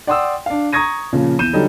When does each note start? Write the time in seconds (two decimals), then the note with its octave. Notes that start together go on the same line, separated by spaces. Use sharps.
0.07 D5 F#5 G5 C6 D#6 E6
0.46 D4 F5
0.73 A#5 C#6 D#6 G#6 A#6 D#7
1.13 A#2 C#3 F3
1.39 E2 G6 D#7 E7
1.53 D3 F#3 G3 D#4